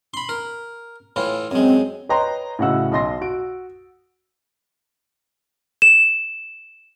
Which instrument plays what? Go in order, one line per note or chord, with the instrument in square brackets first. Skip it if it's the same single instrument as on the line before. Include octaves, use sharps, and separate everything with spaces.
[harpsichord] B5 C6
A#4
A2 E3 F4
[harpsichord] F#2 G#3 [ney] C4
[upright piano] B4 C#5 D#5 G5 A#5 C6
A2 C#3 F#4 D#5 F#5 E6
B1 D#5 C6 A#6
F#4 D7
[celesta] E7